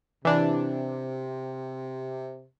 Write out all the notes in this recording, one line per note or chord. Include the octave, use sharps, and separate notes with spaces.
C3 E3 D4